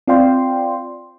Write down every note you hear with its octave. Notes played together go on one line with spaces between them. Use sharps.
C4 F4 D5 F5 G5 C6